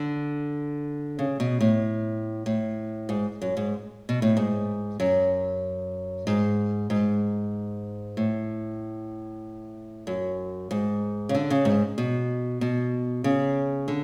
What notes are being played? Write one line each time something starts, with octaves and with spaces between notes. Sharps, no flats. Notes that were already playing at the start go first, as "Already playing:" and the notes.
Already playing: D3
C#3
B2
A2
A2
G#2
F#2
G#2
B2
A2
G#2
F#2
G#2
G#2
A2
F#2
G#2
C#3
D3
C#3
G#2
B2
B2
C#3
D3